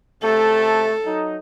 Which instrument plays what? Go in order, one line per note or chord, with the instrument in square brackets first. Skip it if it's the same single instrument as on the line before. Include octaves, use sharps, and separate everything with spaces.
[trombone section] C3 A3 [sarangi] A4
[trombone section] F#3 D#4